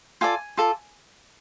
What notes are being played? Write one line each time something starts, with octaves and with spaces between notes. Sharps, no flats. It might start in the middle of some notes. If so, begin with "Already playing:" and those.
F4 A4 D5 G#5
F4 A4 D5